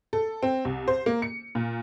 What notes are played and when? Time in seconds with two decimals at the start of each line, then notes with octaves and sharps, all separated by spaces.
0.13 A4
0.43 C4
0.65 C2
0.88 C5
1.06 A#3
1.22 C#7
1.55 A#2